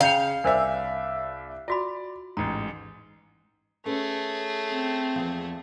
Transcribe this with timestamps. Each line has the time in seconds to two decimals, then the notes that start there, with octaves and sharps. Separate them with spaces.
0.01 C#3 F5 A#5 G6 C#7
0.44 C2 D4 A#4 C5 D5 E5
1.68 F4 F#4 D5 B5
2.37 A1 G#2 A#5
3.86 A3 C#4 G#4 A4 B4
4.71 C4
5.16 E2 F3